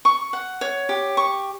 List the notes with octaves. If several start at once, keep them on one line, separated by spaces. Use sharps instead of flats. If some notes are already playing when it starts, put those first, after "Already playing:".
C#6
F#5
C#5
G4
C#6